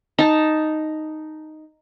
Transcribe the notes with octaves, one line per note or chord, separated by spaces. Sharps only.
D#4 A5